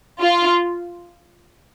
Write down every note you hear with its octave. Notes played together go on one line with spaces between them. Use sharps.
F4